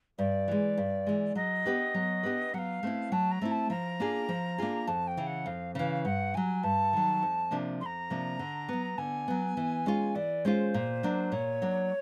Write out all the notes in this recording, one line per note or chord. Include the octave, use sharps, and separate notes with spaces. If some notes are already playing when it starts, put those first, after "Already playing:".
G2 D5
E3 G#3
G2
E3 G#3
F#3 D#5
B3 D4 G4 B4
F#3
B3 D4 G4 B4
F#3 F5 F#5
A3 C4 E4
F#3 A5
A#5
A3 C4 E4
A5
F3 A#5
A#3 D4 F4 G#4
F3
A#3 D4 F4 G#4
F2 A5
G5
C#3 E3
F#5
F2 F5
C#3 E3 F5
G2 F#5
D#3 F#3 G#5
G2 A5
D#3 F#3
F2
C3 F3 A#3 D4
F2 A#5 C6
C3 F3 A#3 D4
D3
F#3 B3
D3 G#5
F#3 B3
E3
G#3 C#4 F4
E3 D5
G#3 C#4 F4 C5
A#2
F#3 A#3 D4
A#2 C#5
F#3 A#3 D4